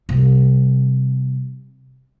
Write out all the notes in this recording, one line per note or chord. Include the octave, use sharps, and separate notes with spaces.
C3 G3